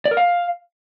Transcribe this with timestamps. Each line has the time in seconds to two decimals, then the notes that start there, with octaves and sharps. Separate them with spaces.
0.05 D5
0.11 A#4
0.17 F5